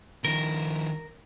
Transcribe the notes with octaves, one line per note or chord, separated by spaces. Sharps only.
D#3 F3 A#4